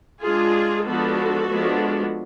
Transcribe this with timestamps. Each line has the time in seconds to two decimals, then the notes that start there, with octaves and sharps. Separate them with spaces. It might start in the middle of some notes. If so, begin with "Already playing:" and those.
0.22 G#3 D4 F4 G#4
0.86 F3 G#3 B3 D4 F#4 A4
1.50 F3 G#3 B3 D4